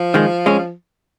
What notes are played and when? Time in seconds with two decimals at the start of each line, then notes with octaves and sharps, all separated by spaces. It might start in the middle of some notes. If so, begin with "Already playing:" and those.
Already playing: F3
0.14 D#3 G#3
0.46 G#3 C#4